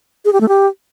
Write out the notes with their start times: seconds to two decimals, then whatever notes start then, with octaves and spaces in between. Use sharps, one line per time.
0.25 G#4
0.33 G4
0.41 A3
0.48 G4